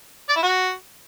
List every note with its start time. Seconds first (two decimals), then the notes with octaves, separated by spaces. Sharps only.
0.29 D5
0.36 E4
0.43 F#4